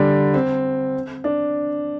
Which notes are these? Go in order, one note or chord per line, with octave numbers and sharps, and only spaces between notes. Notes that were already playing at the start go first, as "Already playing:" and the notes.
Already playing: D3 G3
C4
D4